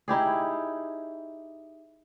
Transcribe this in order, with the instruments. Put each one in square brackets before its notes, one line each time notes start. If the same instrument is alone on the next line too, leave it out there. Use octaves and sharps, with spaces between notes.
[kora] D#4 E4 G4 G#4